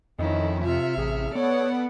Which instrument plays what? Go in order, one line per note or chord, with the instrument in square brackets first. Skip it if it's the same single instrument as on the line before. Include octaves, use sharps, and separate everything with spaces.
[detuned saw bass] F2 [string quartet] D#3 C#4 E4 [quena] D#5
[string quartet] C3 E5 F6 [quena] F4
[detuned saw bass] A1 [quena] G#4
[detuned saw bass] B3 [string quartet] A4 D5 F#5 [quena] C#5